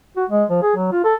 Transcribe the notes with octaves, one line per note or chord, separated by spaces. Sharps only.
F#4
G#3
F3
G#4
F#3
F4
A4